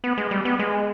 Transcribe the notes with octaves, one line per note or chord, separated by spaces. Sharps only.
B3
G#3
G3
B3
G#3